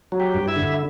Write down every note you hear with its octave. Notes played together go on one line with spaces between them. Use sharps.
F#3
G4
G2
E4 E5
D3